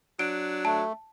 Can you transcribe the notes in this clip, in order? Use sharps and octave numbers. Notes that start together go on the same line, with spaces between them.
F#3 D4 D7
A3 A5